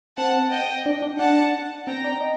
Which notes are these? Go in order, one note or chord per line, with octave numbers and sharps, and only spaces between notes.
C4 F#5 A5
D#5 G5
D4
D4
D4 F#5 A5
C4 G5 A#5
D4
D#4